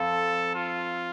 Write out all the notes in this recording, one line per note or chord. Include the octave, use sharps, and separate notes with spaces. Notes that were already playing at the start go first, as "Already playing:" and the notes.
Already playing: F2 F3 A4
F4